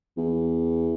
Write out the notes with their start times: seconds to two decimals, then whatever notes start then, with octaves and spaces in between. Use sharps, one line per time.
0.17 E2